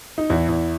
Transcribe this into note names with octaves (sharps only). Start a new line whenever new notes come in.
D#4
E2 E4
E2